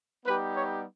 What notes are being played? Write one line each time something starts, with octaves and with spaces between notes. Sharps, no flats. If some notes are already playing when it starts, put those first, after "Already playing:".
G3 B3 D#4 G4 B4
C#5